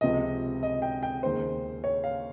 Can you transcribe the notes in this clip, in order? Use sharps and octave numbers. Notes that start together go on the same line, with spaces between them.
C#2 C3 F3 D#5
D#5
G5
G5
D#2 C#3 G#3 C5
C#5
F5